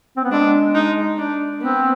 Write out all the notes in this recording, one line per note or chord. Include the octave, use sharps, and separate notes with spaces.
C4
B3
G#3 D4
D#4
D4
B3 C4